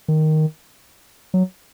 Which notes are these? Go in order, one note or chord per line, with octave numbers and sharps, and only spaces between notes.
D#3
F#3